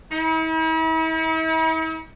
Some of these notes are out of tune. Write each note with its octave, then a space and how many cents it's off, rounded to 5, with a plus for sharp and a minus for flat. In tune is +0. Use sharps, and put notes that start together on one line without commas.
E4 -45